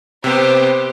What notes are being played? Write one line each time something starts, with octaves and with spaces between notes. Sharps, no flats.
C3 B3 G4 C5